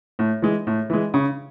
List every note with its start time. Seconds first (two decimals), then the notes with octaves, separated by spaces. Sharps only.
0.19 A2
0.42 E3 G#3
0.67 A2
0.90 E3 G#3
1.14 C#3